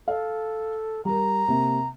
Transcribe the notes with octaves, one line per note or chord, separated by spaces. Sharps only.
A4 F5
G3 A#4 A#5
C3 A#3